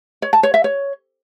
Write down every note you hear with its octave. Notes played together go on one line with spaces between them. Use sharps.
C#5
A5
C#5
E5
C#5